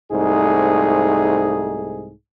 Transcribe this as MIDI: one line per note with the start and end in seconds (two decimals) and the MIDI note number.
0.13 2.12 36
0.13 2.12 44
0.13 2.12 57
0.13 2.12 63
0.13 2.12 68